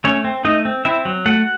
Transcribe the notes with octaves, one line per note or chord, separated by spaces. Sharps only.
A3 C#4 C#5
C4
A3 D#4 D#5
C4
C4 E4 E5
F#3
A3 F#4 F#5